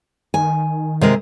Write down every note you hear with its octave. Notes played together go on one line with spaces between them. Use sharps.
D#3 G#5
C3 G#3 A#4